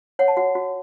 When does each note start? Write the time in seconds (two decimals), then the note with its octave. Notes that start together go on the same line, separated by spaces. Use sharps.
0.19 C#5 F#5
0.28 A5
0.37 F#4 F#5
0.55 F#4